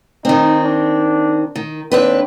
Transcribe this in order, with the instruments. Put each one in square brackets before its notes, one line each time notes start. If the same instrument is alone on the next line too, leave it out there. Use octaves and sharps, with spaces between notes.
[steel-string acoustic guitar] D#3 C4 [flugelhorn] D#4
[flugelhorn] D4
[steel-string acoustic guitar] D#3
[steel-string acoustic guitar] D#2 D4 B4 [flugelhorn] C4